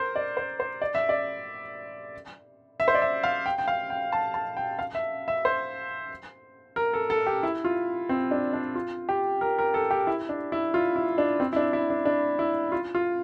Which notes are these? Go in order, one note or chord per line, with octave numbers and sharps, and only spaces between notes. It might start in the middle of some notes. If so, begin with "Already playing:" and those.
Already playing: A#4 C5
D5
C5
C5
D5
E5
D5
E5
C5
D5
E5
F5
G5
G5
F5
G5
A5
A5
G5
F5
E5
E5
C5
A#4
A4
A4
G4
E4
F4
C4
D4
D4
F4
G4
A#4
A#4
A4
G4
E4
D4
E4
F4
E4
D4
C4
E4
D4
E4
D4
D4
E4
F4
F4